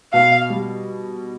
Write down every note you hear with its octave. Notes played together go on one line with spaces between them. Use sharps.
B2 F5
G3